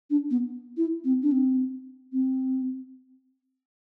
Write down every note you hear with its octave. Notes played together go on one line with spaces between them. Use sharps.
D4
B3
E4
C4
D4
C4
C4